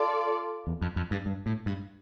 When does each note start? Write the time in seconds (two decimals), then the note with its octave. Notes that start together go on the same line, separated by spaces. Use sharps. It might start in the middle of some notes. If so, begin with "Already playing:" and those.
Already playing: F4 A4 D5
0.67 E2
0.82 F2
0.96 F2
1.11 G2
1.26 G2
1.46 A2
1.66 G2